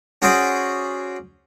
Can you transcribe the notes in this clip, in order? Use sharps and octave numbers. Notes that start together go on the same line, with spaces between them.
C#4 F#4 G#4 C5 D5